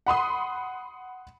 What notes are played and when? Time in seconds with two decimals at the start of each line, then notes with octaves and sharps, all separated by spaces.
0.07 F#5 B5 C6 D#6